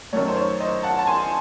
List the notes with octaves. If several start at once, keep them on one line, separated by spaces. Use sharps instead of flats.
F#2 D#3 F#3 A3 C#5
C5
C#5
C5 D#5
F#5 A5
A5
G#5 C6